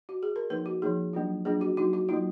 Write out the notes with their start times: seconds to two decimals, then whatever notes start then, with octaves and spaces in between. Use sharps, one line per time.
0.09 F#4
0.23 G#4
0.36 A#4
0.50 F3 A#3 D#4 B4
0.66 F#4
0.82 F3 A#3 D#4 G#4
1.13 F#3 A#3 D4 F4
1.45 F#3 A#3 D4 F4 G#4
1.61 F#4
1.77 F#3 A#3 D#4 F#4
1.93 F#4
2.09 F#3 A#3 D#4 F4